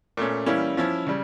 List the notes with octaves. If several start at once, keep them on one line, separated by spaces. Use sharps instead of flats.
A#2 A3 C#4
E3 G3 A#3 C#4 E4
F3 C#4 E4
C#3 G3